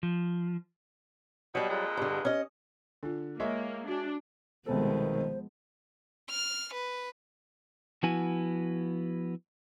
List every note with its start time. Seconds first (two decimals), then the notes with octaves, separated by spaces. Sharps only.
0.03 F3
1.55 B2 F#3 G3
1.69 F2 A#2 G#3
1.97 G2 D3
2.25 C#4 D#5
3.03 D3 F4 G#5
3.40 G#3 A#3 C#5 E5
3.88 D4 F#4 G#5
4.66 C2 B2 D#3 F3 G#3 B3 A4 C5
6.30 F6
6.74 B4
8.03 F3 B3 E4 F#4 G#5